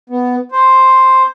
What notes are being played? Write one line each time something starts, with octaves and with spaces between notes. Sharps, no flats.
B3
C5